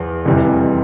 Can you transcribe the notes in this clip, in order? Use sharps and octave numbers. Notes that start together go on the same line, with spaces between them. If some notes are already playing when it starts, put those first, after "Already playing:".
Already playing: E2 F3
F1 F2 C3 E3 G3